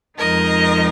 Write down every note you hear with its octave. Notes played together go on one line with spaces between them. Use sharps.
F2 F3 G#3 D#4 A#4 D#5